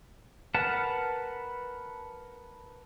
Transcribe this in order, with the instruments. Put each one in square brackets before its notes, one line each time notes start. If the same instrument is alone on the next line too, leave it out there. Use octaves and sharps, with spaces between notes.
[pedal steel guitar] A#4 B4 F#5 A5